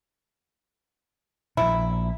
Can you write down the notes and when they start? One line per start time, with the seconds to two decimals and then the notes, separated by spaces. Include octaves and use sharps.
1.57 A#1 A#2 E4